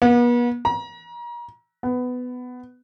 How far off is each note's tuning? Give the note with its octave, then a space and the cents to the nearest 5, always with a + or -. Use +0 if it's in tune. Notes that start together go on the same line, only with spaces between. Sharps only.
B3 -40
A#5 +35
B3 +15